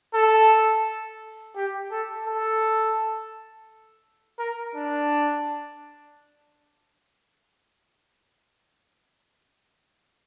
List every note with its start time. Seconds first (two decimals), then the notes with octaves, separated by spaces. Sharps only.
0.14 A4
1.56 G4
1.91 A4
2.27 A4
4.39 A#4
4.75 D4